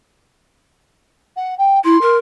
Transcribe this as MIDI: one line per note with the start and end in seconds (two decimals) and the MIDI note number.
1.37 1.57 78
1.58 1.80 79
1.84 1.97 64
1.84 2.16 84
2.02 2.18 70